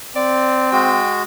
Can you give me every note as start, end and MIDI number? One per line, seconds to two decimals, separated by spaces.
0.16 1.02 60
0.16 0.68 74
0.72 1.23 56
0.72 1.23 66
0.72 1.11 79